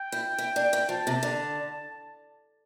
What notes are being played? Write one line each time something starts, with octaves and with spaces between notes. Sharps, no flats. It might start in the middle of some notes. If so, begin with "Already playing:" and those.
Already playing: G5
E4
E4
D4
E4
F3 A5
C3
D3